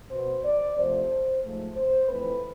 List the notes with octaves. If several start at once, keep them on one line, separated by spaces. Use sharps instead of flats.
B2 B3 C5
D5
C3 F3 A3 C4 C5
G#2 F3 A3
C5
F2 E3 A3 C4 B4